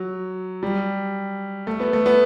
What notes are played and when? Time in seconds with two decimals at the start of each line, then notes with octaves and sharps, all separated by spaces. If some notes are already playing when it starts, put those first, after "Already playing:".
Already playing: F#3
0.63 G3
1.67 A3
1.80 B3
1.93 A3
2.06 B3